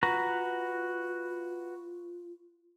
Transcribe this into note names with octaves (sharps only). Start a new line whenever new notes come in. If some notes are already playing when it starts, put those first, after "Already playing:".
F4 F#4 B4 A#5